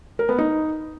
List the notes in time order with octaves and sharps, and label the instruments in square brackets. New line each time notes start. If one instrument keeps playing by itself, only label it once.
[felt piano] A#4
B3
D#4